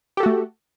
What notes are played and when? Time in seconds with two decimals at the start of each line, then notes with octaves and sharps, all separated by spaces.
0.17 G4
0.20 A4
0.23 F#4
0.26 A3